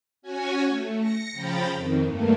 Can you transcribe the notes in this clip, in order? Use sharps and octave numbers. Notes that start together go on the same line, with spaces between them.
C#4 F#4 C#5 G#5
A3
A#6 C#7
C#3 F3 G5 A#5 B5 A6
F2 D#3
G2 A3 A#3